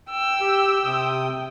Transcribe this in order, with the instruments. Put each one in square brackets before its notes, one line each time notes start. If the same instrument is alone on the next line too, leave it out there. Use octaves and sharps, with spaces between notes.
[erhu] G5 [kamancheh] E6
[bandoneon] G4
C3 D#6